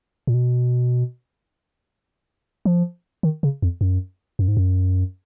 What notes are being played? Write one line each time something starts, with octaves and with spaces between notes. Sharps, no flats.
A#2
B2
F3
D#3
C#3
F2
F#2
F#2
G#2
F#2